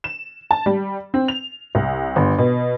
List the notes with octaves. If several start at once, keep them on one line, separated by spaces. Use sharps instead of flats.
E7
A5
G3
C4
F7
C2
G1
B2